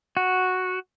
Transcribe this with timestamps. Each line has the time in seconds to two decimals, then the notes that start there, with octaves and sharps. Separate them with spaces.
0.17 F#4